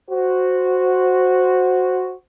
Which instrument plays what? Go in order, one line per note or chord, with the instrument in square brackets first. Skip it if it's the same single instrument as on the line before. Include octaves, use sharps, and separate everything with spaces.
[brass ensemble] F#4 C5